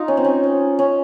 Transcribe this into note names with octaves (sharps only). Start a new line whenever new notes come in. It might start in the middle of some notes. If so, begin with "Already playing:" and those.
Already playing: D#4 F4
C#4
C4
C#4
C#4
C#4